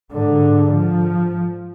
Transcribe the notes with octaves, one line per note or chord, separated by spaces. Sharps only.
G#2 D3
F3